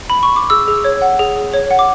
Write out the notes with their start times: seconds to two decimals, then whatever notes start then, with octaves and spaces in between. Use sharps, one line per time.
0.10 B5
0.23 C#6
0.36 D6
0.50 G#4 E6
0.68 G#4
0.84 C#5
1.02 F#5
1.19 G#4
1.36 G#4
1.54 C#5
1.71 F#5
1.79 D6